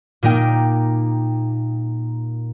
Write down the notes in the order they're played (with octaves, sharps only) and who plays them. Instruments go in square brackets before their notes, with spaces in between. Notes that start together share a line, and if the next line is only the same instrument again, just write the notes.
[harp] A#2 A#3 D#4 G5